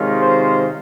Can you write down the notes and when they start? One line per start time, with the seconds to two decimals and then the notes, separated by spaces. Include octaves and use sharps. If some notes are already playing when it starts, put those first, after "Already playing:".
Already playing: C3 D#3 G#3 C#4 F4
0.21 C5